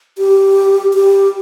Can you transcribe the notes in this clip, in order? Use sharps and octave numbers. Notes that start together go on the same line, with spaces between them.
G4
G4